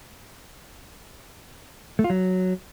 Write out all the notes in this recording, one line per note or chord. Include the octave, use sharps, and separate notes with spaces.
A3
F4
F#3